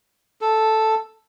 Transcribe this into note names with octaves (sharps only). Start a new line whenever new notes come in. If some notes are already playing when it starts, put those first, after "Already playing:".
A4